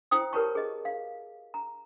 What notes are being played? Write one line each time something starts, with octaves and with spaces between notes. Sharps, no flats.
E4 C5 G5 D#6
G4 A#4 B4 C#5 A5 C#6
G#4 D#5
F5
A#5